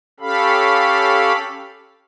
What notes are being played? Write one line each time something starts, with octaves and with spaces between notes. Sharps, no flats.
C#4 G4 A4 F5 B5